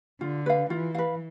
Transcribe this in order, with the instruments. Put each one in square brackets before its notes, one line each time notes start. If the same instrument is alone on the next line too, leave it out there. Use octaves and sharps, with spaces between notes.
[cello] D3 [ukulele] F4
[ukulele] B4 F5
[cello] E3 [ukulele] F4
[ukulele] B4 F5